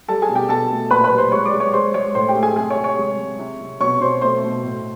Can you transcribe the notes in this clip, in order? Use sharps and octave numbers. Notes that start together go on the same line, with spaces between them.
G3 A4 A5
G#4 G#5
B2
G4 G5
B2 A4 A5
A3
A#2 B4 B5
B4 B5
G3
C5 C6
G#3 C#5 C#6
D5 D6
G#3
C#5 C#6
G#3 C5 C6
G#3 C#5 C#6
A2 C5 C6
G4 G5
A3
G#4 G#5
C3 G#4 G#5
C#5 C#6
C3
C#5 C#6
G#3
G#3
C3
C3
B2 C#5 C#6
B2 C5 C6
A3 C5 C6
B2
A2